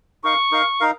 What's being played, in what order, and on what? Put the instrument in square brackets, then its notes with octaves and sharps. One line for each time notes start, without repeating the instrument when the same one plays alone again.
[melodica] D#4 A#4 F5 [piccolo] C#6
[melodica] D#4 A#4 F5
D#4 A#4 F5